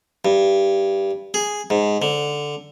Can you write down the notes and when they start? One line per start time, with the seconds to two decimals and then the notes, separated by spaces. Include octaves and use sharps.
0.25 G2
1.34 G#4
1.70 G#2
2.02 D3